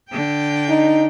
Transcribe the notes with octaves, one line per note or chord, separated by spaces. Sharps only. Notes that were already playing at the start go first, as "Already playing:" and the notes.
D3 G5
D#4